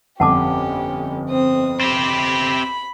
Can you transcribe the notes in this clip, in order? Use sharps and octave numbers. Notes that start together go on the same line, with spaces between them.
G1 F2 C#4 G4 F#5 A5 D6
C4 D#6
C4 G4 B5